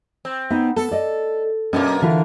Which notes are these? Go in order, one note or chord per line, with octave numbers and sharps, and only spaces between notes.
C4
B3 D#4
B3 A4
D5 D#5
F#2 B2 A#3 C#4 D4
D3 E3 F4 A#4